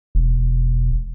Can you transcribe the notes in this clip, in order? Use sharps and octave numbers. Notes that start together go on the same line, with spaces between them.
E1